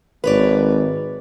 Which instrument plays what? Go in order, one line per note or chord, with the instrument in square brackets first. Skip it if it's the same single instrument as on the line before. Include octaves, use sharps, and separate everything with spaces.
[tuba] G#1 [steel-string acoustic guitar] B4 C#5 D5